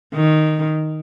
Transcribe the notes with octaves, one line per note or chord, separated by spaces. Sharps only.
D#3